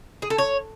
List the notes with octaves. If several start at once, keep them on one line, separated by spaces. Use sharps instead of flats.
G#4
A4
C#5